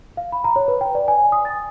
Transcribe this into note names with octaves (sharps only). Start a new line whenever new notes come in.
F5
B5
A#5
C#5
B4
G5
D5
G#5
D#6
A6